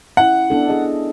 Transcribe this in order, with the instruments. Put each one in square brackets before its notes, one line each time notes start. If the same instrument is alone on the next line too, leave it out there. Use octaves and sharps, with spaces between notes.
[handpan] C#4 E4 [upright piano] F#5
[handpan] B3 D4 A4
D4 G#4 D#5